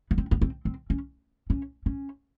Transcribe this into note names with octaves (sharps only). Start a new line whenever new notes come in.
B3
C4
B3
C4
C4
C#4
C#4
C#4